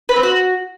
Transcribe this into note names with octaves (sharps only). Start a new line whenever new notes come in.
B4
C4
F#4